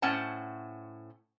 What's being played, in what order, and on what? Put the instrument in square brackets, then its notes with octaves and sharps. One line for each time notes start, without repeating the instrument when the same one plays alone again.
[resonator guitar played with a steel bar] A2 C#4 C5 F#5 A5